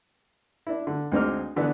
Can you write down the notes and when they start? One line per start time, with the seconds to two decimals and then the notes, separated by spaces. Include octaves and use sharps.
0.67 D4 E4
0.87 D3
1.12 D2 G#3 C4 D#4 D6 F6
1.56 D3 E3 B3 D4